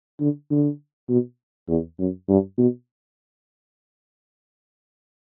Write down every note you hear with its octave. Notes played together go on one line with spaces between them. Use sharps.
D3
D3
B2
E2
F#2
G2
B2